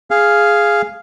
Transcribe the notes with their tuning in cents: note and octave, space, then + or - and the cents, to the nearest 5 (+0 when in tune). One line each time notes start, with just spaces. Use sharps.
G#4 +0 F5 -5